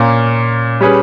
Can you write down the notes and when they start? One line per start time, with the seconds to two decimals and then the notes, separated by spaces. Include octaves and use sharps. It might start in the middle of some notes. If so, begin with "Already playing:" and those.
Already playing: A#2 A#3 C#4
0.81 G3 C#4 G#4 B4